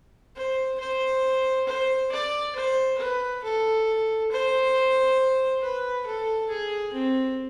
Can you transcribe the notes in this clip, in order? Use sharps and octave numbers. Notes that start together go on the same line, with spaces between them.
C5
C5
C5
D5
C5
B4
A4
C5
B4
A4
G#4
C4